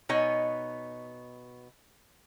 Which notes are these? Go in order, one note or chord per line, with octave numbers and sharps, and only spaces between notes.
B2 B3 D#4 C#5 D#5 G#5